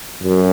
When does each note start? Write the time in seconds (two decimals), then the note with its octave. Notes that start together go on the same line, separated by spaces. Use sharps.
0.23 F#2